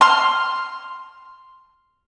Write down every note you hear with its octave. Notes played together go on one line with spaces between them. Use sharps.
C6 F6